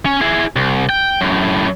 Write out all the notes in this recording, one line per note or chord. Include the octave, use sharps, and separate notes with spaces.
C#4
E4 G#4
C2
G5
F#2 A2